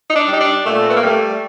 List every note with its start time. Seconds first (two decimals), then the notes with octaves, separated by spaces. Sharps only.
0.08 D#4
0.15 D4
0.28 G3
0.33 D#4
0.41 D4
0.65 A#2 A3
0.80 C4
0.87 B3
0.96 A#3
1.03 G3 A3